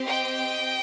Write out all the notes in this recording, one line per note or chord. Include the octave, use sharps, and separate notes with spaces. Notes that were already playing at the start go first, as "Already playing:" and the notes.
Already playing: C4 G4
D#5 G5